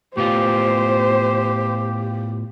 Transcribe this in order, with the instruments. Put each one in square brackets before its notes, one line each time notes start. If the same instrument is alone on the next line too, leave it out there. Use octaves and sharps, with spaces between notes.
[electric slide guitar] A2 B3 F4 [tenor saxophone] G4 [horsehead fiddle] C5